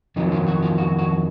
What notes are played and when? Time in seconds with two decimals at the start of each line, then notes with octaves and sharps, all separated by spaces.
0.16 F2 D#3 F#3 D#4
0.32 F4
0.47 F#4
0.62 F4
0.78 F#4
0.98 F#4